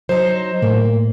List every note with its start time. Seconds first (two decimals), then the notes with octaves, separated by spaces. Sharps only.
0.09 F#3 D#4 C5
0.62 A2 A#3